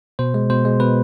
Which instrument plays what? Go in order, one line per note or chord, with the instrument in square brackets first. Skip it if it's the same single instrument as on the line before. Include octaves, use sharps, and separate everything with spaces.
[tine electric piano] B2 C5
G#3
B2 C5
G#3
B2 B4